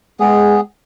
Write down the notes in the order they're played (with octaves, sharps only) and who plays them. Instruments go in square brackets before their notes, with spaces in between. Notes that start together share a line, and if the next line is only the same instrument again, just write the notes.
[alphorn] G#3 [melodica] B3 G#4